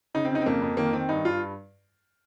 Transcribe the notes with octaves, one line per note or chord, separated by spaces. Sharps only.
C#3 D#4
C4
C#3 D#4
C4
F2 A#3
F2
D#3 A#3
D#3 C4
G2 D#4
G2 F4